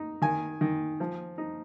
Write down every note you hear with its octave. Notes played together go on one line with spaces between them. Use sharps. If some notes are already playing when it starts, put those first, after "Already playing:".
Already playing: D#4
D#3 G#5
D#3
F3
D#4